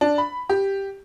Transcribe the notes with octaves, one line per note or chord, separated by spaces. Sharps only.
D4
B5
G4